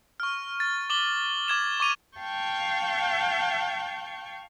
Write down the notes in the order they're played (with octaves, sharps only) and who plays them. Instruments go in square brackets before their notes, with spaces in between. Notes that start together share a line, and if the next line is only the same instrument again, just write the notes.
[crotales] C#6 F6
A6
D6 F#7 G7
D6 G#6 E7
C#6 D6 D#7 F7
[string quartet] F5 G5 A5 C#6 G6